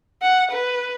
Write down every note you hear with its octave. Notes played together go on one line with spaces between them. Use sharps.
F#5
B4